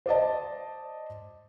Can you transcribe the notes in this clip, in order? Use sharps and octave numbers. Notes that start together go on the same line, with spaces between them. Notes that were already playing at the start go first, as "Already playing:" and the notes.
C5 D5 D#5 A5